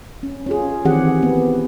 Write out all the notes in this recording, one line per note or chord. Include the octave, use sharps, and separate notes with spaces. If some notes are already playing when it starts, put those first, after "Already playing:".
C#4
C#4 F4 G#4
D#3 E3 C4 G4 G#4 F#5
B3